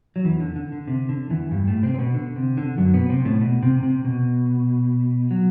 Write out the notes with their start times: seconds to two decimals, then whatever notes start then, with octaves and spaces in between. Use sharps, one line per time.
0.16 F#3
0.24 E2 E3
0.40 D3
0.56 D3
0.72 D3
0.87 C3
1.09 D3
1.30 E2 E3
1.51 G2 G3
1.67 A2 A3
1.83 C3 C4
1.94 C4
1.99 B2 B3
2.15 D3
2.36 C3
2.57 D3
2.78 F#2 F#3
2.94 B2 B3
3.09 C3 C4
3.25 A2 A3
3.41 B2
3.63 C3
3.83 C3
4.05 B2
5.31 F#3